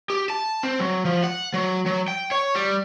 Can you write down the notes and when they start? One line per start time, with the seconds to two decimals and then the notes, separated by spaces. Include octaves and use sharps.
0.10 G4
0.30 A5
0.63 C4
0.80 F#3
1.05 F3
1.24 F#5
1.54 F#3
1.86 F#3
2.08 G5
2.31 C#5
2.55 G3